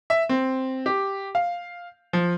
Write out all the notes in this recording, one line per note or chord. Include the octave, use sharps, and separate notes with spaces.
E5
C4
G4
F5
F3